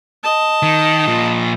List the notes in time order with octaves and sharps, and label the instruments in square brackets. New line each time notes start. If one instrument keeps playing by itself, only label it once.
[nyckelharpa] D#5 A5
[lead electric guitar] D#3
A#2 F3